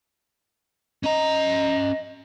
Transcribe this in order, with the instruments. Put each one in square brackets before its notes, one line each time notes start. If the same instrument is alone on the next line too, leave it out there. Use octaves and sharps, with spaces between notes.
[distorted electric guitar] C#4 A#5 [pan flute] D#5